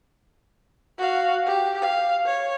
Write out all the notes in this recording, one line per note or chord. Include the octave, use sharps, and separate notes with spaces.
F#4 F5
G4
F5
C#5